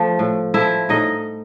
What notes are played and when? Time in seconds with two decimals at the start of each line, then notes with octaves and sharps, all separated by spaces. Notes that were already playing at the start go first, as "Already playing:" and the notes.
Already playing: F3 A3
0.19 A2
0.54 F3 A3 E4 E5
0.89 A2 D#4 D#5